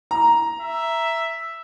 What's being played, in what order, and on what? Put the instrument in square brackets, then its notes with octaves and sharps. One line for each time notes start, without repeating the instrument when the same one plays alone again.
[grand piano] A#5
[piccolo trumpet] E5